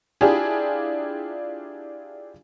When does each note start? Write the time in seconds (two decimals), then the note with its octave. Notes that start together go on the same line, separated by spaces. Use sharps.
0.21 D4 E4 F4 G4 G#4